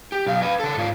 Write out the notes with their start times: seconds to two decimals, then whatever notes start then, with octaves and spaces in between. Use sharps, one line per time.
0.12 G4
0.26 B1 F5
0.42 B4 F5
0.60 C#3 A4
0.76 G#2 F4